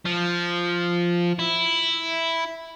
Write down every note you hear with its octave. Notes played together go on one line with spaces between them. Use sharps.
F3
E4